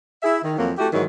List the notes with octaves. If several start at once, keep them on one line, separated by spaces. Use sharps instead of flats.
E4 G#4 E5
D#3
F2 F#3 A#3
A3 E4 F#4 G4
G#2 D#3 E3 F#3